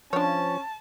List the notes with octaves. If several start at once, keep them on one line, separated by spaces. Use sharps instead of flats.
F3 C#4 D4 C#5 A5